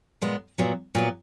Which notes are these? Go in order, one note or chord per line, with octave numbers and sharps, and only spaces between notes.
A#2 G#3 B3
A#2 F#3 B3
A#2 F#3 B3